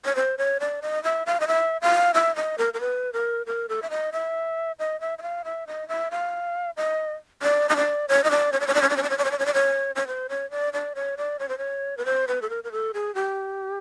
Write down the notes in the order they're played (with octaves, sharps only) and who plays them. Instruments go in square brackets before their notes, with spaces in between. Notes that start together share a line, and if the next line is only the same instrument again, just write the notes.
[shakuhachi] C#5
C5
C#5
D5
D#5
E5
F5
D#5
E5
F5
E5
D#5
A#4
A#4
B4
A#4
A#4
A4
E5
D#5
E5
D#5
E5
E5
F5
E5
D#5
E5
F5
D#5
D5
D#5
D5
C#5
D#5
D5
C#5
D5
C#5
D5
C#5
D5
C#5
D5
C#5
D5
C#5
D5
C#5
D5
C#5
C#5
C5
C#5
D5
D5
C#5
D5
C#5
C5
C#5
B4
C5
B4
A4
A#4
A#4
A4
G#4
G4